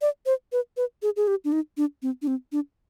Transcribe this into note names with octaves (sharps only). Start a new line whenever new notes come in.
D5
C5
B4
B4
G#4
G#4
G4
D4
D#4
D4
C4
D4
C4
D4